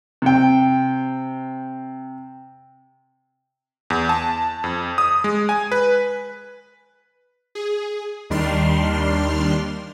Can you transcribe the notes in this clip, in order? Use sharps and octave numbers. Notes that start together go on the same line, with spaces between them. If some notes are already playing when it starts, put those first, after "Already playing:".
C3 G5
E2
A5
F2
D#6
G#3
G#5
B4
G#4
D#2 D#3 G3 D4 C6 F6